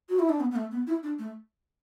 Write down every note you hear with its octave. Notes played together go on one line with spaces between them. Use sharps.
F#4
E4
D4
B3
B3
A3
B3
E4
D4
A3